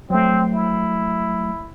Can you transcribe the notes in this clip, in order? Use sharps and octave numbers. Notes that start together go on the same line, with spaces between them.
F#3 A3 C4
E4